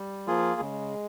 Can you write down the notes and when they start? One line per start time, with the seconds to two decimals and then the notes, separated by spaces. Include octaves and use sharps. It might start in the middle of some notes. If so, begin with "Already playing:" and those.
Already playing: G3
0.27 F3 A#3 F4 G#4
0.61 C#3 G#3